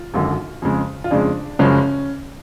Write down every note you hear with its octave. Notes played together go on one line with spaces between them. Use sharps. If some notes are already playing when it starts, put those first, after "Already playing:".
Already playing: F4
G#1 F#2 D3
F2 C#3 G#3
F4
F2 C#3 G#3 D4
F#1 F#2 C#3 F3 G#3 C#4